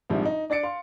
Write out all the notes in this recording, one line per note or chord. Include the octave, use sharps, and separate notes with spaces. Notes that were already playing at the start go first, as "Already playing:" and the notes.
A#1 G#2 C3 F3 G3
D#4
D4 D5 A6 C#7 D7
F5 C6